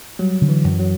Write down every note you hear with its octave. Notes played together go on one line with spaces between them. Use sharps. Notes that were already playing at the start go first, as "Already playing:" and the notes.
F#3 G3
D3
E3
F#2
F#3